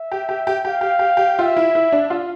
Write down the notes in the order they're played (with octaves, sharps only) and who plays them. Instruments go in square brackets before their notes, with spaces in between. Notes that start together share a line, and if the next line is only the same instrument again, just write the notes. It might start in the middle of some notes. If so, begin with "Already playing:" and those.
Already playing: [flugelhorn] E5
[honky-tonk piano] G4
G4
G4
[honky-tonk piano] G4 [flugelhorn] F5
[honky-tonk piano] G4
G4
G4
[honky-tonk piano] F4 [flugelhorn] E5
[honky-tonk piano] E4
E4
D4
F4